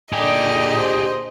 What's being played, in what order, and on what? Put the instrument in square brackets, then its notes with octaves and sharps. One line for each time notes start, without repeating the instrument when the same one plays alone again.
[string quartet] A#2 D3 D#4 [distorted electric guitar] G4 G#4 [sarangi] D5 [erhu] D#5
[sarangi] C5